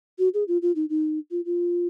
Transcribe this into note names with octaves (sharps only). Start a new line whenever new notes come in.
F#4
G#4
F4
F4
D#4
D#4
F4
F4